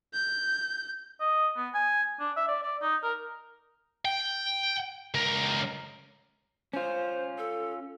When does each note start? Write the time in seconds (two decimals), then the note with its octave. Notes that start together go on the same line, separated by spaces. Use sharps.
0.14 G6
1.21 D#5
1.56 B3
1.74 G#5
2.20 D4
2.36 E5
2.48 D5
2.63 D5
2.82 D#4
3.03 A#4
4.05 G5
5.14 C#2 A#4
6.73 C#4 F4 C5
7.38 A4